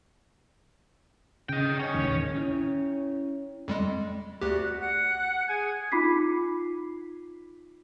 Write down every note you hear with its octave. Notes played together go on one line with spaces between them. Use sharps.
C#3 D#5 G5
C#4 C#5
A1 D#2 D#3
C#4 E4 C#5
F2 G3 G#3
D2 F#4 G4 D5 F#6
F#5 F#6
G#4 G#5 G#6
D#4 F4 B5 D6 B6 C7